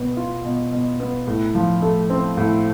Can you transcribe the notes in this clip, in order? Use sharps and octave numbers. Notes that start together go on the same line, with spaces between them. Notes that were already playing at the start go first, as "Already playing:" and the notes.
Already playing: B2 B3
F4
B2
B2
B3
A2
F3
A3
C4
A2